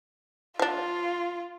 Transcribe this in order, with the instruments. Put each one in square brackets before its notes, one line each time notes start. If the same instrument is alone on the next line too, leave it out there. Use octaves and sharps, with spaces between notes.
[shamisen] F3 D4 [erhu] F4